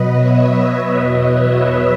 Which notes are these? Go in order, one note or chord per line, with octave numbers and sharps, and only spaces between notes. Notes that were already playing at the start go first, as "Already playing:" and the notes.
Already playing: B2 F#3 B4 D#5
C#5 E5
E2 B2 F#3 B4 D#5
C#5 E5